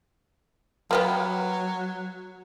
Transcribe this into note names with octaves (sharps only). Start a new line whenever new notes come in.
F#3 A#3 B3 G4